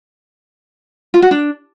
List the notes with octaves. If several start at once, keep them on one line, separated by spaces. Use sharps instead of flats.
F4
F#4
D4